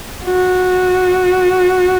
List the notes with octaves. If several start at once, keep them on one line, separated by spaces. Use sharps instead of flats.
F#4